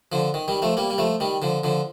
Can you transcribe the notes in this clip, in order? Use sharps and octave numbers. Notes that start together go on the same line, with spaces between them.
D3 F3
D#3
D#3 G3
F3 A3
G3 A#3
G3
F3 A3
D#3 G3
D3 F3
D3 F3